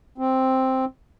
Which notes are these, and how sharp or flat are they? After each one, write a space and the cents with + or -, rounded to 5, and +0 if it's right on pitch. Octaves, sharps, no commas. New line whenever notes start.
C4 +0